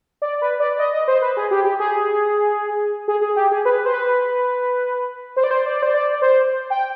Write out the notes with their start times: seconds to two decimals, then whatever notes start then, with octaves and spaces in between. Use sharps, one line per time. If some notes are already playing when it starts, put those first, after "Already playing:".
0.22 D5
0.41 B4
0.60 D5
0.79 D#5
0.93 D#5
1.08 C5
1.22 B4
1.37 G#4
1.51 G4
1.64 G4
1.80 G#4
3.08 G#4
3.21 G#4
3.36 G4
3.51 G#4
3.65 B4
3.86 C5
3.93 B4
5.37 C5
5.44 D5
5.51 C5
5.66 D5
5.82 C5
5.94 D5
6.22 C5
6.70 G5